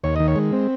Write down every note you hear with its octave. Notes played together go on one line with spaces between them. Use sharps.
D#2 C#5
D#3 D#5
C#5
G#3
C4